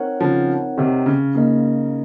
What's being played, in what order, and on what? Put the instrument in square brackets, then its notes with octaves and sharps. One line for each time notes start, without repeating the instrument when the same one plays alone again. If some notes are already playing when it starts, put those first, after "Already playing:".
Already playing: [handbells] C4 D#4 A#4 C#5 F#5
[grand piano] C#3 F3
C3 D#3
C#3
[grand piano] C#3 [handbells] A#3 D#4 A#4 D#5